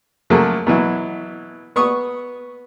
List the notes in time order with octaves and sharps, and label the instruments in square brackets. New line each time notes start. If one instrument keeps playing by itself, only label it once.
[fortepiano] C#3 F3 F#3 A3 A#3
B2 E3 F#3 E4
B3 C#6 D#6